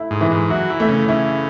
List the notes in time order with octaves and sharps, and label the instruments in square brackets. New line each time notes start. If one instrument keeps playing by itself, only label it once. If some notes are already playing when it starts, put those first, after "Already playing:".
Already playing: [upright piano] A3 E4
[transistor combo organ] G#2
[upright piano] E3
[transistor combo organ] G#2
[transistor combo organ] F#3 [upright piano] E4
[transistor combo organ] E3
[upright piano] A3
[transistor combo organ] C#3
[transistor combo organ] C#3 [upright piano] E4